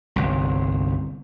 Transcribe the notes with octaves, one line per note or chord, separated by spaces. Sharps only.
G1 C2